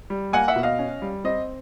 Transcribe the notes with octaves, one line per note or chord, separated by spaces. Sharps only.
G3
A#3 F#5 G#5
E5 F#5
B2
D#5 F5
C#4
G3
C4 D#5